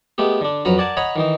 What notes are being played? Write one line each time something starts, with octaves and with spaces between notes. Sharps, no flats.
G#3 A3 B3 G4
D3 D4
F2 F#3 B4 F#5 A#5
A#4 D5 F#5 G#5 A5
C#5 D#5 F#5 G#5 A#5 B5
D#3 E3 D#4